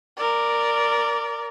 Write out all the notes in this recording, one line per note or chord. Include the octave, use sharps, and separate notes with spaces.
A#4 D5